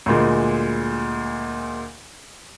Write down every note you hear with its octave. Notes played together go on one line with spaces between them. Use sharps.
D2 A#2 G#3